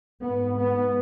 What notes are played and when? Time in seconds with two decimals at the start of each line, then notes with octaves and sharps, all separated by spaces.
0.22 G#2 B3
0.57 B3